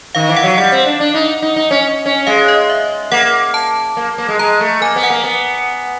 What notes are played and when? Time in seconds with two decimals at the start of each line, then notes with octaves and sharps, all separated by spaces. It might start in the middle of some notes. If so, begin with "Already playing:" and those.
0.15 D#3 F5
0.29 E3
0.36 F#5
0.44 F#3
0.58 G3 F#5
0.72 C4
0.86 D4
1.00 D4
1.14 D#4
1.42 D#4
1.56 D#4
1.71 C#4
2.06 C#4
2.27 G#3 F5
2.48 D#5
2.70 E5
3.12 A#3 F#5
3.54 A5
3.97 A#3
4.18 A#3
4.29 G#3
4.39 G#3 A#5
4.61 A3
4.82 A#3 G#5
4.96 B3
5.03 F#5
5.10 A#3
5.24 B3